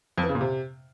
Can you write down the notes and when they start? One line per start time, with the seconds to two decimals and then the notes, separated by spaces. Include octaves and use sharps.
0.18 F2
0.23 E3
0.29 C#3
0.35 A#2
0.41 C3